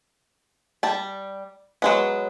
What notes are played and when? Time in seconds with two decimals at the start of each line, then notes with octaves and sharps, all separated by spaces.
0.83 G3 A5
1.82 F#3 G#3 B3